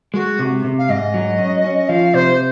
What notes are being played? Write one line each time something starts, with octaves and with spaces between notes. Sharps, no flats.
G#3 F#4
C3
C3
F5
G#2 D#5
F#3
C#4
C#4
F3 F5
C3 C5